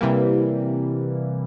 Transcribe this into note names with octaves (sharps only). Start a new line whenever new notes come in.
C3 E3 G3 A#3